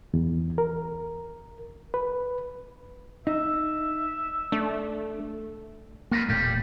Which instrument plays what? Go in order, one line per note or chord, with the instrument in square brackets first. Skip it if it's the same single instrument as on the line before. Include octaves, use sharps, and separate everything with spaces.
[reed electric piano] E2
A#4
B4
[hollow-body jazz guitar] D#4 [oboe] E5
[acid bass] A3 [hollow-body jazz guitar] D4
[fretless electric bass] A#3 [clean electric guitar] F4 A#4 B4
[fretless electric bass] E1 A#2 A3 [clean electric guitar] C#3 G3 G4